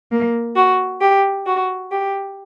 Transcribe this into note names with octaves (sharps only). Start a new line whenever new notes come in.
A#3
F#4
G4
F#4
G4